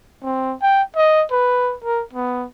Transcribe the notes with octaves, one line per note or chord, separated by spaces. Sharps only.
C4
G5
D#5
B4
A#4
B3